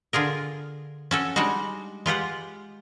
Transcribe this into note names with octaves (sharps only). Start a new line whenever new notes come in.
D3 F4 G#4 A#4
C#4 F#4 A4
G3 G#3 D4 D#4 F#4
G#3 F4 G4 F#5